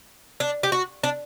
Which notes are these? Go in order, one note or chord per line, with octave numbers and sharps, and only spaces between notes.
D4
G4
F#4
D4